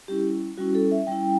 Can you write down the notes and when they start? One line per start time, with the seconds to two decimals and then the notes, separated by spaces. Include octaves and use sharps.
0.08 G3 C#4 E4 G4
0.58 G3 C#4 E4 F#4
0.75 A4
0.91 E5
1.07 G3 C#4 E4 G5